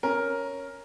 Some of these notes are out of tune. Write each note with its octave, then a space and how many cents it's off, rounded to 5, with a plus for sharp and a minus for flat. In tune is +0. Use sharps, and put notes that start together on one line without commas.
C#4 +0 A#4 +5